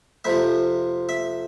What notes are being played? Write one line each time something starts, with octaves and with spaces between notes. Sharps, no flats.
F2 C3 F3 E5
E5